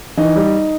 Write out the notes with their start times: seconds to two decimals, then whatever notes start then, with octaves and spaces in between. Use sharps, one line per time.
0.17 E3 D#4
0.36 G3